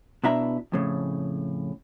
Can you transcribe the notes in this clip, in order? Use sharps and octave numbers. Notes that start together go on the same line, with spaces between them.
B2 D4 E4 E5 A#5
F2 A2 C#3